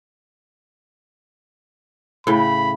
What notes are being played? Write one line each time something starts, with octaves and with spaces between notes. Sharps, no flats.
A2 C#3 B5